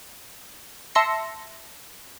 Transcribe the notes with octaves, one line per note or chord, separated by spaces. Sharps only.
E5 A5 C6 E6 A#6 C#7